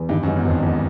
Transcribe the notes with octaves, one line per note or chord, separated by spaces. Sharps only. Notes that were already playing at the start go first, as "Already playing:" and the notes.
Already playing: E2
G2 D#3
F#2
G#2
E2
G#1 F2
G#1 E2